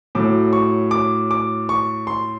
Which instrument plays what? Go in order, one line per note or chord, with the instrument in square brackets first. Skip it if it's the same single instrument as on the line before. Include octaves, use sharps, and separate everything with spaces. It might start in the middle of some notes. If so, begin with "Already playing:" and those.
[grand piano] A2 F#3 D6
C#6
D6
D6
C#6
C6